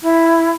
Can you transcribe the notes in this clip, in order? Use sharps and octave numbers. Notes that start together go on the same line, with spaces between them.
E4